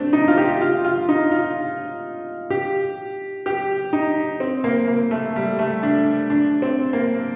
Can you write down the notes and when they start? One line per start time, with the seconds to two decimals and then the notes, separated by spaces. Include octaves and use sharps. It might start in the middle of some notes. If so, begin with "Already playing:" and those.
Already playing: A3 C4 D4
0.13 D#4
0.28 F4
0.38 G4
0.61 F4
0.85 F4
1.09 D#4
1.32 F4
2.50 G4
3.46 G4
3.93 D#4
4.40 C4
4.64 A#3
4.88 A#3
5.11 A3
5.36 G3
5.59 A3
5.83 D4
6.30 D4
6.62 C4
6.93 A#3